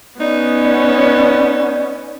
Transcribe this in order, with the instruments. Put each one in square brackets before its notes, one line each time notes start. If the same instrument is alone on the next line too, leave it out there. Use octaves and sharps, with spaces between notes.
[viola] B3 C#4 [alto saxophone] D#4 [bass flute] D5